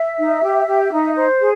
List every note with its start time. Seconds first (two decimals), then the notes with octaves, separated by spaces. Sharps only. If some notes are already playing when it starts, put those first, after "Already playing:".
Already playing: E5
0.18 D#4
0.42 G4
0.67 G4
0.91 D#4
1.15 C5
1.39 G#4